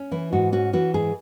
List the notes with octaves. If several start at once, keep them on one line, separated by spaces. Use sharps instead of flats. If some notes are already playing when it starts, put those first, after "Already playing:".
Already playing: C#4
E3 E4
G#2 F#4
C#4 F#4
E3 F#4
G#2 G#4